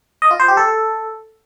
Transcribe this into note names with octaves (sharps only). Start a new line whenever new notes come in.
D#5
F4
C5
G4
A4